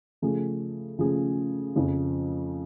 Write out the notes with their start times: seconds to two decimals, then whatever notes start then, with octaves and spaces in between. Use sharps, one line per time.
0.22 C#3 F3 A3 C#4 G#4
0.98 C#3 F3 A3 C#4 G#4
1.76 F2 C#3 F3